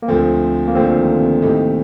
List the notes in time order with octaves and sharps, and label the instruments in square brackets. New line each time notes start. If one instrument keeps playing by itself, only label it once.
[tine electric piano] A#3
[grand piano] D2 D3 F3 A3 [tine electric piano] C4
[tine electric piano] A#3
[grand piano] D2 D3 F3 A3 [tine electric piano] C4
[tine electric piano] D#3
C3
[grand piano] A2 A3 D#4 G4